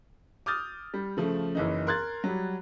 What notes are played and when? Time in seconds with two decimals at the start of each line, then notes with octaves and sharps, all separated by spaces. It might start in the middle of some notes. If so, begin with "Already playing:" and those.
0.46 D6 D#6 F6 G6 A6
0.94 G3
1.17 C#3 F3 A3
1.55 F#1 E3 D#4
1.87 A#4 C6 F#6 G#6 A6
2.24 F#3 G3